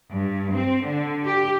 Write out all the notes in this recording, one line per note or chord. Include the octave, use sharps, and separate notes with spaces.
G2
C4
D3
G4